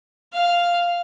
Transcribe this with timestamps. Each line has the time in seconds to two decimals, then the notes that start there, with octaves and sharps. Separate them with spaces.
0.33 F5